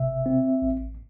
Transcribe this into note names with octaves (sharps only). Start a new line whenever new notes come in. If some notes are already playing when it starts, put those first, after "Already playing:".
Already playing: G#1 C3 E5
C4
A1